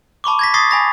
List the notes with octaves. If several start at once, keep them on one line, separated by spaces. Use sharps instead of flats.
A5 B5 C#6 D6
G#6 A#6 B6
C#6 D#6 A6 A#6 C7
G#5 B5 A#6 B6